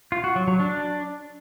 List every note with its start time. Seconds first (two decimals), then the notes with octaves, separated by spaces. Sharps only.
0.12 F4
0.24 F#4
0.36 F#3
0.48 F#3
0.59 D4